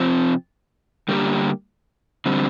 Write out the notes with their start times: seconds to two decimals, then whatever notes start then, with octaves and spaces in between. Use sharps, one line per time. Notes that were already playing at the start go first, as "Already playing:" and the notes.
Already playing: C3 F3 C4
1.08 D3 G3 A#3 G4 A#4
2.26 D3 G3 C4